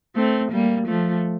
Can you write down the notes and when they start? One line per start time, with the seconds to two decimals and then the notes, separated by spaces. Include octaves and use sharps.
0.15 A3 C4
0.51 G3 A#3
0.87 F3 A3